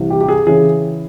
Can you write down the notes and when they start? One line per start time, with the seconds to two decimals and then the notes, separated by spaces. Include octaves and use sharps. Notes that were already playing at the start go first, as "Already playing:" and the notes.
Already playing: C2 C3 E3
0.10 G4
0.21 G4
0.29 G#4
0.47 C#3 E3 G#4